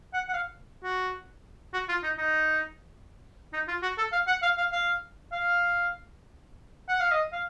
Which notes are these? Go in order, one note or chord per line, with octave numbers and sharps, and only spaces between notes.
F#5
F#5
F5
F#4
F#4
F4
D#4
D#4
D#4
F4
F#4
A4
F5
F#5
F5
F5
F5
F5
F#5
F5
D#5
F5